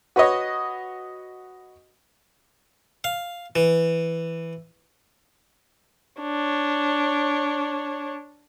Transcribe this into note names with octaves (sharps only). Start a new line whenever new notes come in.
F#4 B4 C#5 D#5
F5
E3
D4 C#5